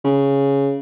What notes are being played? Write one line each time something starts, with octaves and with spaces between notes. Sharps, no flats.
C#3